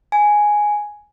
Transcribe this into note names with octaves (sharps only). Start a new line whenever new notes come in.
G#5